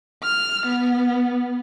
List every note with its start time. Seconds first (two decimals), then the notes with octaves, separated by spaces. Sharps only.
0.23 F6
0.67 B3